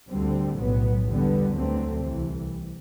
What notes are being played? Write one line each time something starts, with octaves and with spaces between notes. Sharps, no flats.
D2 D3 G3 C4
B1 A2 F#3 B3
E2 D3 G3 B3
D2 D3 F#3 A3 C4
C2 C3 E3